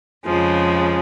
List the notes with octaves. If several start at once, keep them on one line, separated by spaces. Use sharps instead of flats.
F2 C#3 F3 G#3